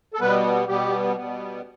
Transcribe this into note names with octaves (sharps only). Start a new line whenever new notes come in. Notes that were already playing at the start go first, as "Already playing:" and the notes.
A4
B2 G3 B3 B4
B2 G3 B3 G4
B2 G3 B3